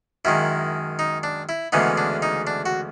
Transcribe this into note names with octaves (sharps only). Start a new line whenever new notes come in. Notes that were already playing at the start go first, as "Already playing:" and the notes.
F#2 D#3 G#3 E4
D#4
D4
E4
D2 C#3 E3 G#3 B3 D#4
D4
D#4
D4
F#4